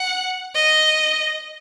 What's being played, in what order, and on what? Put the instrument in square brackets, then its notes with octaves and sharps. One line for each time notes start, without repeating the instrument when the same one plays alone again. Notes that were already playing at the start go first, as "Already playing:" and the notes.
Already playing: [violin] F#5
D#5